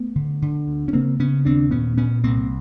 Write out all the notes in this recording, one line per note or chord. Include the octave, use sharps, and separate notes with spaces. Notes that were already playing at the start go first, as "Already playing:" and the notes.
Already playing: A3 B3
D3
D3
D2
C#4
C#3 A#3 C4
C#3 B3 C#4
D#2 C4 D4
A#2 B3 C#4
A#2 B3 C#4
C2 A#3 C4